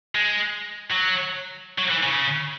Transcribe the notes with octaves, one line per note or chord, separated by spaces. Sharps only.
G#3
F#3
F#3
E3
C#3